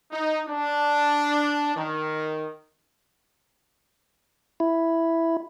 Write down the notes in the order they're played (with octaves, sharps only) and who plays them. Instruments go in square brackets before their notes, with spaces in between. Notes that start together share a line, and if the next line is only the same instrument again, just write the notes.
[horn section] D#4
D4
D#3
[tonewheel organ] E4